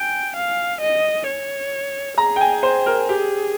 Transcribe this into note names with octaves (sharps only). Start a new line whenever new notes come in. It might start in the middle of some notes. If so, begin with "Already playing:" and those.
Already playing: G5 G#5
F5
D#5
C#5
G#4 A#5
G5
G#5
C5
A#4
G4 G#4